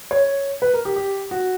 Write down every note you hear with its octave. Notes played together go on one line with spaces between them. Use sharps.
C#5
B4
A#4
G4
G4
F#4